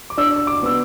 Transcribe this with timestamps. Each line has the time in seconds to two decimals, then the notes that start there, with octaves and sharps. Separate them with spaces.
0.10 D6
0.18 D4 E6
0.36 E6
0.47 D6
0.63 B3 E6